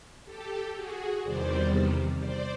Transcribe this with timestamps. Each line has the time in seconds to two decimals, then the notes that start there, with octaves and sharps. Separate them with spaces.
0.25 G4 A4
0.74 F#4 G#4
1.22 E2 C3 D#3 G3 C5 D5
2.19 C5 D5